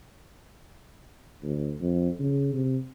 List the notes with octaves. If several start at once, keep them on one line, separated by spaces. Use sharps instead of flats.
D2
F2
C#3
C3